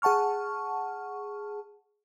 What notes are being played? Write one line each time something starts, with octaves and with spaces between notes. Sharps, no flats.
G#4 F#5 A5 C#6 F6